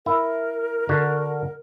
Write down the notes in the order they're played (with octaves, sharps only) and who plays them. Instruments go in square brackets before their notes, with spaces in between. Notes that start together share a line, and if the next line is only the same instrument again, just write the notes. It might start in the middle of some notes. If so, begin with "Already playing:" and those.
[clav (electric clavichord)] E4 [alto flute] A#4
[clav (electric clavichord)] D3 F#4